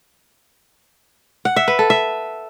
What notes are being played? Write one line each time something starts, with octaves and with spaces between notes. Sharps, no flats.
F#5
E5
B4
A4
E5